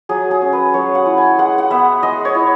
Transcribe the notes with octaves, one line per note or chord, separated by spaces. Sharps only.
F#3 G#4
G#4
C#4
B4
F#3 C#5
F#5
E4
G#5
G#3 F#5
F#5
B3 E5
G#3 D#5
C#5
E4